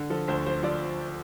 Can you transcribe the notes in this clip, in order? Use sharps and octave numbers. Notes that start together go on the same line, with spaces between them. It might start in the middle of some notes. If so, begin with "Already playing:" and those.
Already playing: D3
F3 A4
D2 C5
F3 C5
F3 D5